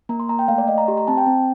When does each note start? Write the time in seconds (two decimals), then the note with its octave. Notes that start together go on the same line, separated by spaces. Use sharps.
0.09 A#3 A#5
0.20 C6
0.29 A#3 A#5
0.39 G5
0.48 A3 F5
0.58 D5
0.68 A3 D#5
0.78 A#5
0.88 G4 C6
0.97 A#5
1.08 C4 A5
1.17 G5
1.27 C4